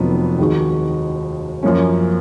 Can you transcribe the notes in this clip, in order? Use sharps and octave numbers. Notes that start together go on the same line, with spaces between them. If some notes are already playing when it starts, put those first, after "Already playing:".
Already playing: F1 F2 D#3 F#3 B3
D#2 D#3 G#3 D#4 F#4
F#2 F3 A#3 C#4